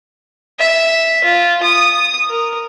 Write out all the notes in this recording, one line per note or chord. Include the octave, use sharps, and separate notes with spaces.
E5
F4
D#6
A#4